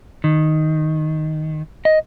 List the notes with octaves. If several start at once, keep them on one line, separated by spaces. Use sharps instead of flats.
D#3
D#5